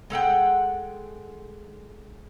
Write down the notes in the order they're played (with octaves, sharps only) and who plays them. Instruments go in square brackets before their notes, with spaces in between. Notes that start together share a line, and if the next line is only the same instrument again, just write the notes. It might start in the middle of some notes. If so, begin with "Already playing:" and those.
[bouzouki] G#3 A4 F#5 G5